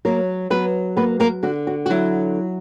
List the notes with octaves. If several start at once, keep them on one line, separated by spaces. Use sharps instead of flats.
F#3 A#3 A#4
F#3 B3 B4
A#3 B3 B4
A#3 A#4
D3 F#4
F#4
F#4
F#3 E4